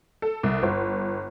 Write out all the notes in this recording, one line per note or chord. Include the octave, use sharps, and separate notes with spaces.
A4
C2
G1